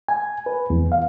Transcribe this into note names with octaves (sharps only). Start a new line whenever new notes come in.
G#5
B4
E2
F5